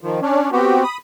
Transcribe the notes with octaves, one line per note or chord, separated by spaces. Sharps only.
D#3 F3
C#4 D4
B3 C4 F#4 G4
B5 D#6